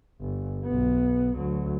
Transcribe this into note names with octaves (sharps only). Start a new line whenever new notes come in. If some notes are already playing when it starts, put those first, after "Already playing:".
G1
B1 B3
D2 F#3